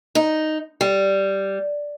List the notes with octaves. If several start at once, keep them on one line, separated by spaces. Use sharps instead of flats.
D#4
G3